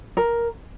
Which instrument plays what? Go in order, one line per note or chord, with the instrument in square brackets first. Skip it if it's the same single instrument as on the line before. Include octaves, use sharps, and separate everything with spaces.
[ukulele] A#4